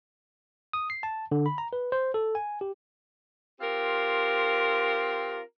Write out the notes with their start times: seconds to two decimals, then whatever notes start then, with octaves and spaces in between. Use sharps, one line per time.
0.73 D#6
0.90 C7
1.03 A5
1.32 D3
1.46 B5
1.58 A#5
1.73 B4
1.92 C5
2.14 A4
2.35 G#5
2.61 G4
3.61 C4 F4 G4 A#4